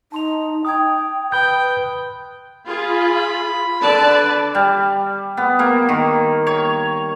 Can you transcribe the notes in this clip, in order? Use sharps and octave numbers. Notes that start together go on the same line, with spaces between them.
D#4 A5 C6 F7
G5 D#6 G#6
B4 G5 B5 D#6 F#6 G6 G7
F4 G#4 B5
D3 B4 D5 A5
G3
B3
A#3
D#3
C#5